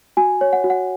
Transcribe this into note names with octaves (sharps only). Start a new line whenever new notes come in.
F#4 G#5
C#5
F#5
F#4
F#5